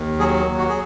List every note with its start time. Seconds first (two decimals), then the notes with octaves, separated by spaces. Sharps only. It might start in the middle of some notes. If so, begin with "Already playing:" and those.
Already playing: D#2
0.19 F#3 G#4
0.46 D#2
0.58 F#4
0.69 G#4